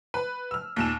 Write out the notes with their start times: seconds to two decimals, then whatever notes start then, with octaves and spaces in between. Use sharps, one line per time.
0.14 B4
0.51 E6 F6
0.76 D#2 A#2 E7